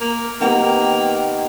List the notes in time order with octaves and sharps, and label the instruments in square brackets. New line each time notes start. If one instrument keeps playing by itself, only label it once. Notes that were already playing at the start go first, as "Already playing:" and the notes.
[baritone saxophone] A#3
[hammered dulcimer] D#3 B3 G4 [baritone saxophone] A#3